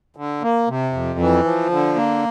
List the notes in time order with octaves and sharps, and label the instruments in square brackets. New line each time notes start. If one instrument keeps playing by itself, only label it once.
[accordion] D3
A#3
C3
F2
E3
F3
D3
A#3